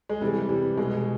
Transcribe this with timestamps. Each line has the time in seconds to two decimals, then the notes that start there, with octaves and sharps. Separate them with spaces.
0.09 G#3
0.21 C3 E3 G3
0.49 C3 E3 G3
0.77 B2 G#3